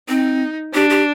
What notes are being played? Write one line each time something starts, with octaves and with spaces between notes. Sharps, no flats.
C4 D#4
D4 G4
G4